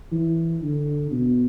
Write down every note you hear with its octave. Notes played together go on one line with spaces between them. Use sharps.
E3
D3
B2